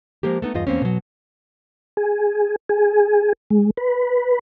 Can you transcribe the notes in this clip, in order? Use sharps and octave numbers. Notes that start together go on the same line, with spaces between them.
F3 G#3 A#3 G4
A3 B3 D#4
E2 G2 F4 D#5
E2 A#3 C4 C#4
B2 F#3
G#4
G#4
G#3
B4